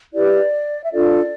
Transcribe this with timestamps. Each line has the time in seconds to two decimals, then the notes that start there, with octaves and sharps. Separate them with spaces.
0.13 E4 G4 B4 D5
0.82 E5
0.93 D4 F4 A4 D5